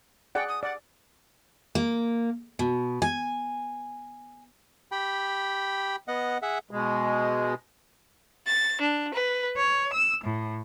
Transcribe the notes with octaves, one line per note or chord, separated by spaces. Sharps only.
G#4 D5 F#5 G5
D#6
D5 F#5
A#3
B2
G#5
G4 G5 B5
B3 D#5 F#5
G#4 E5 F#5
B2 G#3
A6
D4
B4
C#5
E6
A2